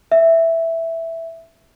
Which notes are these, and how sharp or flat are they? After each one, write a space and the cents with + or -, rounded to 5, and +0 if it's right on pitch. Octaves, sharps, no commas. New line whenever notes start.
E5 +0